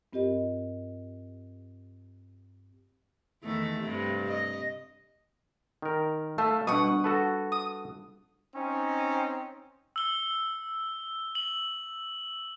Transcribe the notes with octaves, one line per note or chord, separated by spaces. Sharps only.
G2 C4 F4 G4 A#4 D#5
E2 D#3 A3
G2 C3
D#5
D#3 A#4
A3 F4 E5 A5
B2 G3 D4 F#5 C#6 D#6
F#4 A4 B4 A5
D#6
C4 C#4 D#4
E6 G7
F#7